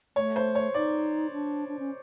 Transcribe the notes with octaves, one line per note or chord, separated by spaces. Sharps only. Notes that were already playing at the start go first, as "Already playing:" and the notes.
A3 C#5
C5
C#5
D#4 D5
D4
D4
C#4